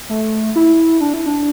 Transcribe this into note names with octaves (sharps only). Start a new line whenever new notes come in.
A3
E4
D4
E4
D4